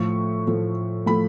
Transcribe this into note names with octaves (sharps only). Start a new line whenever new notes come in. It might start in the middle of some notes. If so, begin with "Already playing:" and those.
Already playing: A2 F3 A3 C#6
A2 F3 A3
A2 F3 A3 B5